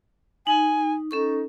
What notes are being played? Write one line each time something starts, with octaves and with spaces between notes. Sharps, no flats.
D#4 G#5
C#4 D#4 A4 C#6